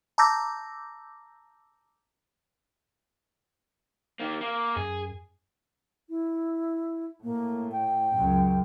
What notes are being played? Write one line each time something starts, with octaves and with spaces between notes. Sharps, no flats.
A5 A#5 D6 E6 G6 A#6
D#3 A#3
A#3
F#2 G#4
E4
A2 A#3
G5
C#2 F#2